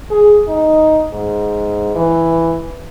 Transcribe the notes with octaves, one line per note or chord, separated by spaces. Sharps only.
G#4
D#4
G#2
E3